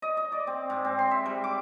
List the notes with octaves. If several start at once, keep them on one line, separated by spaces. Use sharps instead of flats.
D#5
D#5
D5
C4
G#2
C4
C6
E5
G3
D6